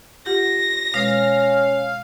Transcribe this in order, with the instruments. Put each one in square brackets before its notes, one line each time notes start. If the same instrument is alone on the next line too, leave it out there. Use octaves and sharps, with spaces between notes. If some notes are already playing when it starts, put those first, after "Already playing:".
[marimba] F4 G4 F#5 [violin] A#6
[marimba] B2 G#3 [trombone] C#4 [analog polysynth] F5